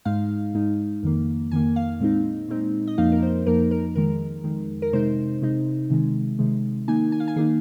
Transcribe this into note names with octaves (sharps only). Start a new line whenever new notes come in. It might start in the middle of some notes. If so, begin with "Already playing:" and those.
G#2 G#3 D#4 F5
G#2 G#3 D#4
F2 D#3 A#3
F2 D#3 A#3 G#5
F5
A#2 G#3 C4 D#4
A#2 G#3 C4 D#4
D#5
F2 F3 A#3 D#4 F5
A#4
C5
F2 F3 A#3 D#4 A#4
A#4
F2 D#3 G#3 A#4
F2 D#3 G#3
A#4
C3 G#3 D#4 C5
C3 G#3 D#4
C3 D#3 G#3
C3 D#3 G#3
D#3 A#3 D#4 G#5
G#5
F5
G#5
D#3 A#3 D#4 G#4